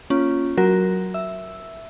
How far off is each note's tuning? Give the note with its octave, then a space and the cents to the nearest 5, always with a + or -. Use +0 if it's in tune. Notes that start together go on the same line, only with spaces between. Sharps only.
A#3 +0 C#4 +0 F4 +0
F#3 +5 F#4 +0 A#4 +5
E5 +0 E6 +0